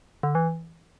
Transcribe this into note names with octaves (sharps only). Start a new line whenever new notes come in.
D3
E3